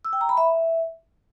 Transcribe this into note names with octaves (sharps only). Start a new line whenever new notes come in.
E6
G5
A#5
B5
E5